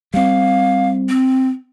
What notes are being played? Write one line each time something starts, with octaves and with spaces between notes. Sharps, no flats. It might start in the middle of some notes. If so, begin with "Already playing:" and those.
G3 C4 F5
C4